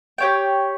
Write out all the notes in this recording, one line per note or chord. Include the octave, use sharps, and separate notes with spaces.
G4 C#5 G5